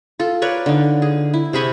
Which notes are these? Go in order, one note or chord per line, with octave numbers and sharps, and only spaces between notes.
F4 A4
A#4 B4 C#5 D5
D3 D#4
G#4
E4
C3 G#4 B5 C#6